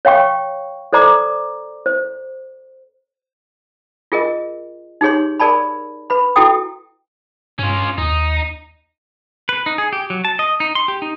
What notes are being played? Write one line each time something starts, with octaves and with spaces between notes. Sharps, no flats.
C#5 F5 G5 C#6
A4 C5 D5 A#5 D6
C5
F4 G#4 A#4 D#5
D#4 G4 G#4 C#5 C6
G#4 A#4 D5 A5 B5
B4 B5
E4 F#4 A4 G5 D#6
G2 C#4 F4
D#2 D#4
B4
D#4
G#4
G4
F#3
A5
D#5
D#4
C6
G4
D#4